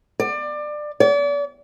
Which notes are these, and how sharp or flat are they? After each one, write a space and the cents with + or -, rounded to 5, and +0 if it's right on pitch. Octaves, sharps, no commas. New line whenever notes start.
D5 +25
D5 -40